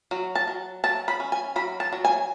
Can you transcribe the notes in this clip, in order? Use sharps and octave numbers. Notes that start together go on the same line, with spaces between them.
F#3
A5
F#3
F#3 A5
B5
C#4
G#5
F#3 B5
A5
F#3
G#5